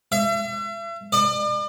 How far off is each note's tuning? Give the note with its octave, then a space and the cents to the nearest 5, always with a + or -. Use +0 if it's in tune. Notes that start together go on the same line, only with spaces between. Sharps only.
E5 +40
D5 +40